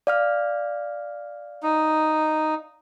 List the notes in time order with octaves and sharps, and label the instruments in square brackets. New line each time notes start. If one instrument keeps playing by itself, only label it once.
[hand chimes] D5 F5 F6
[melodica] D#4